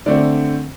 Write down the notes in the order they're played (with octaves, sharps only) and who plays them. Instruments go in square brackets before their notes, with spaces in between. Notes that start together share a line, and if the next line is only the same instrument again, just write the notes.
[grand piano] D3 A3 C4 D5